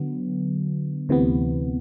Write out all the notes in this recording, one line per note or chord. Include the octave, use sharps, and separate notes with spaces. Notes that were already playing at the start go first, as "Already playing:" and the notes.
Already playing: D3 F#3 B3
D2 C3 E3 B3